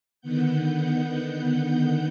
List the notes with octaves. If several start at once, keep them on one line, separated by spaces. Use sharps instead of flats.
D3 D#3 B3 F#5 G6